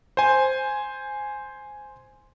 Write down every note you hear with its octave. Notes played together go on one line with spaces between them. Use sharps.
C5 G#5